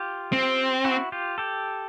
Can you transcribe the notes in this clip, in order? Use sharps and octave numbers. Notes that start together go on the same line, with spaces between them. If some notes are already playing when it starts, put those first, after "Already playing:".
Already playing: F4 G4
C4
E4 F#4
F4 G4
G4 A4